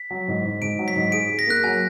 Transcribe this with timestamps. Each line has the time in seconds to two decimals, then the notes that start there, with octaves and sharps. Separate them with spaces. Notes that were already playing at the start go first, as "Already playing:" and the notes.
Already playing: B6
0.11 F#3
0.28 G#2
0.45 G#2
0.62 G#2 D7
0.79 F#3
0.88 B6
0.96 G#2
1.12 G#4 D7
1.30 G#4
1.39 A#6
1.47 A#3 F#6
1.64 F#3 G#5